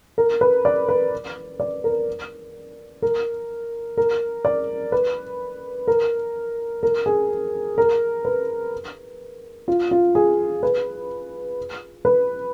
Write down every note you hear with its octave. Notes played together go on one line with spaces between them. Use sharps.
A#4
B4
D5
B4
D5
A#4
A#4
A#4
D5
B4
A#4
A#4
G#4
A#4
B4
F4
F4
G#4
B4
B4